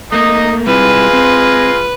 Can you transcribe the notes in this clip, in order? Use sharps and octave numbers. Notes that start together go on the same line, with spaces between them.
A3 A#3 D#4 D#5
G3 G#3 C4 E4 F4 B4
C4